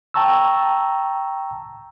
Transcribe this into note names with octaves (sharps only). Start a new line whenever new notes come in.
G5 A5 A#5 C#6 E6